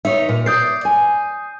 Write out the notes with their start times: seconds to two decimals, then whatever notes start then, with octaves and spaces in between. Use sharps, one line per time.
0.05 D#4 C#5 E5
0.29 A#2
0.46 D5 D#6 G6 C7
0.85 G#5